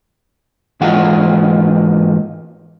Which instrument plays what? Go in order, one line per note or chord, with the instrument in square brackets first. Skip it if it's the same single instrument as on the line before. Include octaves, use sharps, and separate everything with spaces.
[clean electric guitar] G#2 E3 A#3 E4 F4 F#5